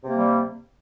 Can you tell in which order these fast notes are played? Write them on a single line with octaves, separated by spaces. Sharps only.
C3 A#3 G3